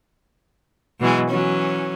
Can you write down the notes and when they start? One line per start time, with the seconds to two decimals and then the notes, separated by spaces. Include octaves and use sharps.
1.00 B2 E3 F#3 G#3
1.30 E3 F#3 C#4